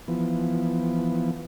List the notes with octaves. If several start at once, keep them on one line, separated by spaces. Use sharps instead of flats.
E3 F3 B3